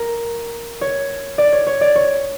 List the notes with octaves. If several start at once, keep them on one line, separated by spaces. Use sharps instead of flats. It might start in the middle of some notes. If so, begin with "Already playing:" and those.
Already playing: A#4
C#5
D5
C#5
C#5
D5
C#5